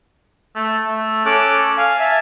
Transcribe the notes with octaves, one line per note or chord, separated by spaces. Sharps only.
A3
A3
C#4 A4 D6 F#6
F5 G#5
E5 A5